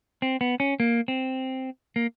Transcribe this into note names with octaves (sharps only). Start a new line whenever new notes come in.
C4
B3
C#4
A#3
C4
A#3